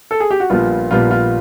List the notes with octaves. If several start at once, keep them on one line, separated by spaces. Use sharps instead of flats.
A4
G#4
G4
F#4
A#1 A#2 G3 B3 F4
A#1 A#2 G3 B3 F4
F4